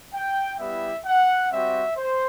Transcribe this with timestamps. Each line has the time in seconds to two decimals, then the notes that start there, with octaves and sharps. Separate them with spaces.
0.13 G5
0.59 G3 B3 E4 G4 E5
1.05 F#5
1.51 G3 C4 F#4 E5
1.97 C5